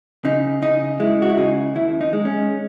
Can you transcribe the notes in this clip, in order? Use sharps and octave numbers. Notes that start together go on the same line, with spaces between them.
C#3 D#4
C#3 D#4
G#3 E4
F#4
E4
C#3 D#4
D#2 E4
D#4
G#3
C#4